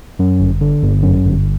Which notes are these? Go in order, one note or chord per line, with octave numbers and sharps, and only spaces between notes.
F#2
G1
D3
G1
F#2
G1